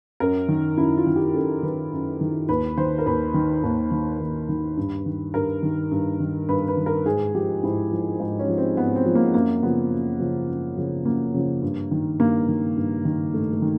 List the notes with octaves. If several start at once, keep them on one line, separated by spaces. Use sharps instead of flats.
F#2 A#4
D#3
F#2 E4
F4
D#3
G4
F#2 A4
D#3 B4
F#2
D#3
D#2 B4
D#3 C5
A#4
D#2 B4
D#3
D#2
D#3
D#2
D#3
G2
D#3
G2 A#4
D#3
G2
D#3
G2 B4
B4
D#3
A#4
G#2 G#4
F3 G4
G#2 E4
F3
G#2 D#4
C#4
F3
C4
G#2 B3
C4
F3
A#3
F#2 A#3
C#3 F3 B3
F#2
C#3 F3
F#2
C#3 F3
F#2 A#3
C#3 F3
G2
D#3
G2 A#3
D#3
G2
D#3
G2 A3
A3
D#3